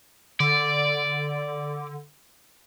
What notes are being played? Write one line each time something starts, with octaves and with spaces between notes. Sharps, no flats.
D3 D5